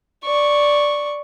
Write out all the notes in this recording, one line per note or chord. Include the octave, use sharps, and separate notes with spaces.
D5 C#6